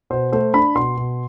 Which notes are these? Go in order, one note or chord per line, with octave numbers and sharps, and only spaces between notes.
B2 C5
A3 C5
D4 B5
B2 C6
B2